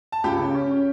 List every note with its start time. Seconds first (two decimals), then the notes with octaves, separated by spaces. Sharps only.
0.12 A5
0.24 C#2 G4 G5
0.39 C#3
0.54 C#4
0.71 C#4